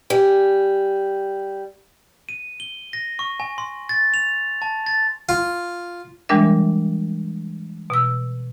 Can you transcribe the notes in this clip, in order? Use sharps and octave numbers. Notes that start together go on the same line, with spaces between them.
G3 G#5
D#7
G7
A#6
C#6
G#5
C6
A6
F7
A5
A6
F4
E3 G3 G#3 D4 A#4 E5
B2 E6